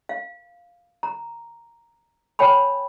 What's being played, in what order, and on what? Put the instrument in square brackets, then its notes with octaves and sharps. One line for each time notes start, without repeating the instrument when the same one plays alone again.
[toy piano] F5
A#5
C#5 G5 G#5 B5